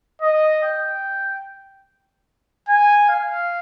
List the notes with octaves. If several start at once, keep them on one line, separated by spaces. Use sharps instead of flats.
D#5
G5
G#5
F5